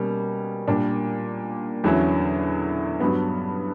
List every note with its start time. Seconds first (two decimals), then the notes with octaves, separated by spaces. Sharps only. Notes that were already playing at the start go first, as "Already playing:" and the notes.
Already playing: B2 G3 A#3 C#4
0.68 A#2 G3 A#3 D4
1.84 E2 D3 F#3 C#4 E4
3.00 G2 F#3 B3